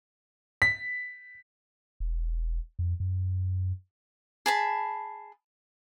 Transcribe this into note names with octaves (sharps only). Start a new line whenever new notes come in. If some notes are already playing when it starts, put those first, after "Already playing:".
B6
E1
F2
F#2
G#4 A5 B5